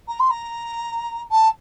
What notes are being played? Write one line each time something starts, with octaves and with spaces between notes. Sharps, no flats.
A#5
C6
A#5
A5